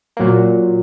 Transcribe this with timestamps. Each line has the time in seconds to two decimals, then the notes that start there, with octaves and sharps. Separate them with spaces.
0.17 A#2 F#3 A#3